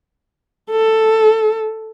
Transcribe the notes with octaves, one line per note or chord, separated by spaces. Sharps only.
A4